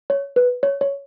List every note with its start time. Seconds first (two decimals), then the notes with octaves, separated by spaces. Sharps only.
0.10 C#5
0.36 B4
0.63 C#5
0.81 C#5